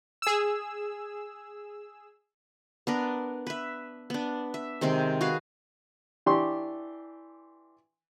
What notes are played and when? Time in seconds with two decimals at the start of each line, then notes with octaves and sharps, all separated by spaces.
0.22 G#4 E6
2.87 B3 D4 A#4
3.47 B4 E5
4.10 B3 D4
4.54 E5
4.81 C3 D#3 G#3 C4
5.21 F#4 G#4 B4 F5
6.26 E3 D4 G4 C6 C#6